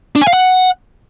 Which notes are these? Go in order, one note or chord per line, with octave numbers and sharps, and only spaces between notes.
D4
G#5
F5
F#5